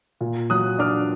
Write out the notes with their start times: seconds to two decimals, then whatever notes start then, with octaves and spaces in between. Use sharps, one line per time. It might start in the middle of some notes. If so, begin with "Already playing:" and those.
0.21 A#2
0.50 F#3 D#6 F#6
0.79 D4 D6 F6